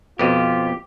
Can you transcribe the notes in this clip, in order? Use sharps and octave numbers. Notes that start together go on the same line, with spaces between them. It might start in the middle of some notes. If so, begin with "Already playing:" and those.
F2 B2 F4 G4